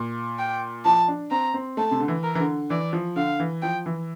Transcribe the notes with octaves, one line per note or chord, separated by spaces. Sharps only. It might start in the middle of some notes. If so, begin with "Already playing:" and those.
Already playing: A#2
G5
F3 A5
D4
C4 A#5
C4
A3 A5
C3
D3
E3
A#4
E3
D3
E3 D5
F3
D3 F5
E3
F3 G5
E3